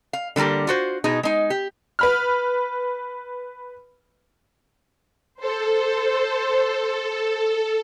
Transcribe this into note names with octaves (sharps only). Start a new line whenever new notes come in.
F5
D3 G3 A3 A#3 G4
F4 F#4 C5
B2 D#4 G#4
G#3 D#4
G4
B4 B5 F6
A4 C5